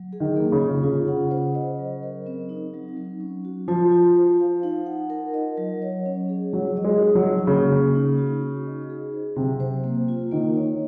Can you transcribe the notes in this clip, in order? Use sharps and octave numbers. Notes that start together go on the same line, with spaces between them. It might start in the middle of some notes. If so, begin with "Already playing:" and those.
Already playing: F#3
G#4
D#3
A#3
C#3
F4
C#3 F4
F#5
C5
D#5
F#3
A#4
C4
D#4
F#3
F#3
C#4
F#4
F3 F4
F4
C5
F5
D#4
F#5
A#4
D#5
F#3
C#5
C#4
G#4
F#3 G#3
D#5
G#3
D#4
F#3
G#4
C#3 A#3
A#3
D#4
F#4
D#4
D#5
G#4
C5
C3 F#3
C5
A#3
F4
D#3 A#3
C#5